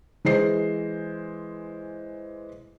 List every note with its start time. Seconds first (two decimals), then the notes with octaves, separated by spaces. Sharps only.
0.25 E3 G#3 C5 C7